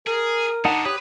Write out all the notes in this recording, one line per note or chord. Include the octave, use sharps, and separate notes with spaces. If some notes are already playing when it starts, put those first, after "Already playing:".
G#4 A#4
D3 B3 D#4 F#5 A5
G4 B4 C#5 D#6